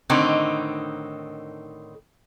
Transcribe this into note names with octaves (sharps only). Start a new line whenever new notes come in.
A2 D3 D#3 C4 D#4